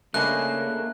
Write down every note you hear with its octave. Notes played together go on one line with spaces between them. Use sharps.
C#3 A3 A#3 D4 D#4 G#4 B4 F#6